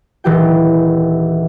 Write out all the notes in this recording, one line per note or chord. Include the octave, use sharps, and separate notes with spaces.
D#1 E3 G4 G5